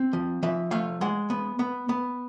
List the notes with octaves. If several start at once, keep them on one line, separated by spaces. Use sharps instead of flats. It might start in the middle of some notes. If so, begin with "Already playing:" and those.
Already playing: C4
F3
F3 E5
A3 F5
G#3 F#5
B3
B3
B3